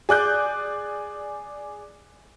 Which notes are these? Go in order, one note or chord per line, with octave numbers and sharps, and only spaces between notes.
G#4 D5 F#6 G6